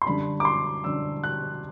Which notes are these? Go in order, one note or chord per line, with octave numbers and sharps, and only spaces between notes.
C6
F#2 D3 G3 D4 B5
D6
C6
F#2 D3 G3 D4 E6
F#6